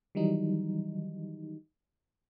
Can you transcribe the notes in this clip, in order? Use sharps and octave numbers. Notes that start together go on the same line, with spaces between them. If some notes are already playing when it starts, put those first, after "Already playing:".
D#3 E3 F#3 G3 D#4